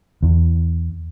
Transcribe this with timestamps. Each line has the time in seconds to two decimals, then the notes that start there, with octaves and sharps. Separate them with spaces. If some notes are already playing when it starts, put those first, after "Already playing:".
0.23 E2